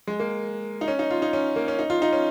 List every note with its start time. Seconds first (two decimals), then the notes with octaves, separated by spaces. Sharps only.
0.07 G#3
0.20 A#3
0.81 D#4
0.88 C#4
0.99 D#4
1.10 F4
1.22 D#4
1.33 C#4
1.56 A#3
1.68 C#4
1.79 D#4
1.90 F4
2.02 D#4
2.13 C#4